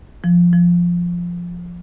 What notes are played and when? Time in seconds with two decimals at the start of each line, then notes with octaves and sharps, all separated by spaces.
0.24 F3
0.53 F3